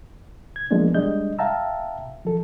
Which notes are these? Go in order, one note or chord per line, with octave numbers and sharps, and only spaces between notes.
G#6
F3 G#3 A#3 B3 D4
G3 G#3 D4 D#5 G6
E5 F5 G5 A5 A#5 E6
F3 A4